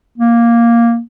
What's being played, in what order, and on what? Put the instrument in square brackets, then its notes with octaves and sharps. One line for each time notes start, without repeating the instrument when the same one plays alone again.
[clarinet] A#3